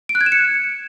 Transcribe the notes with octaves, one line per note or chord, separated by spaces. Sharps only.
D7
F#6
G#6
E7
C#7